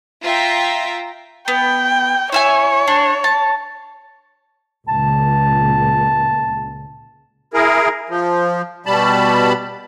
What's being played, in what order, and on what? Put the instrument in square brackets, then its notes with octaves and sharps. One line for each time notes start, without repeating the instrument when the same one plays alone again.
[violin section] F4 E5 G5 A#5
[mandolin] B3 [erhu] G5
[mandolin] E4 E5 G#5 [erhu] C#5
[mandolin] D4
A5
[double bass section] C#2 A#2 [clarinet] A5
[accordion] E4 G#4 A#4
F3
B2 G3 A5 B5